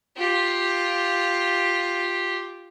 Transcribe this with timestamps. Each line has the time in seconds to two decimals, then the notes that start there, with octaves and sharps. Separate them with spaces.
0.17 F4 G4